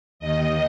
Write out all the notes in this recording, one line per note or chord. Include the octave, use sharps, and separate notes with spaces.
D#2 D#3 D#5